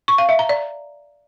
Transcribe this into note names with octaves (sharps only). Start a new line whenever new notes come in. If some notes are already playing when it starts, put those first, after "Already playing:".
C#6
F5
E5
A#5
D5